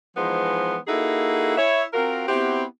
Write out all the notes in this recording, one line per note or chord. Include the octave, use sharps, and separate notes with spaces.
E3 F3 G#3 B3 D#4 C5
A#3 D#4 E4 F#4 G#4 A4
E4 C#5 E5
C4 F4 F#4 A#4
B3 C4 E4 F#4 G4